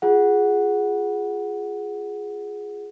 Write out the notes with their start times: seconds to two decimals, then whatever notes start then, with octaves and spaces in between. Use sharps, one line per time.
0.02 F4 G#4 F#5